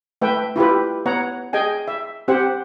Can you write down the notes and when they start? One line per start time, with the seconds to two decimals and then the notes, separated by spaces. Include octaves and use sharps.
0.22 A3 B4 E5 G5
0.56 E4 F4 G4 B4
1.06 B3 C#5 F#5 A#5
1.53 G#4 D#5 G5 G#5
1.88 E5
2.28 C4 G4 C5 F#5